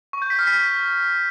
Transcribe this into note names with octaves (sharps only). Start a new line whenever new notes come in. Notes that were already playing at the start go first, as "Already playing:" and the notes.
C#6
G6
B6
F6
B6